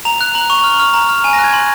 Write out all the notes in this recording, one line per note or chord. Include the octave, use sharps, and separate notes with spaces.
A#5 F7
F#6
A#5 F#7
C#6 F7
F6
F6
A#5
F6
G#5 D#7
A#6
F#6
G#6
C6 F#7